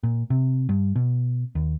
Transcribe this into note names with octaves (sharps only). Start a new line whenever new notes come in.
A#2
C3
G2
B2
D#2